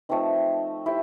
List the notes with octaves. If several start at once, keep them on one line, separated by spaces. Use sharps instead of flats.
F3 A3 C4 D#4
E4 G4 C5 E5